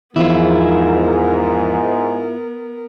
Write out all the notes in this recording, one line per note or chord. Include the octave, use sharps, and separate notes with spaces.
E2 G#2 F3 B3 E4 F4 A#4